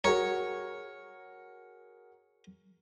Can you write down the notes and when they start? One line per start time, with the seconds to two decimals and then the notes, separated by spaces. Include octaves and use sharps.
0.04 F#4 G#4 A#4 C#5